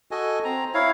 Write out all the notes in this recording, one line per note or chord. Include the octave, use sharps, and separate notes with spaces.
F#4 A4 D#5 G#5
C4 A#5
E4 C#5 F5